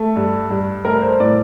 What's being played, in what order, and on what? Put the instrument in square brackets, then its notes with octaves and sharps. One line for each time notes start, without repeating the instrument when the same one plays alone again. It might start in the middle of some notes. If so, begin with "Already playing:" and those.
Already playing: [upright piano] A3
G2
G2
A3 A#4
C5
A2 D5